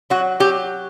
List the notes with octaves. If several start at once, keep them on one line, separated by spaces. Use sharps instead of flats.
F#3 F#4
F#3 G4